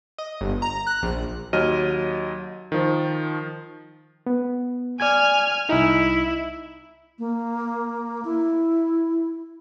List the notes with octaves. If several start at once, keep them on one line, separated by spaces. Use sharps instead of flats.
D#5
G1
A#5
F#6
A#1
D#2 F#3 D#5 F6 D#7
D#3 F3
B3
D5 G#5 F6 G#6
C2 D#4 E4
A#3
E4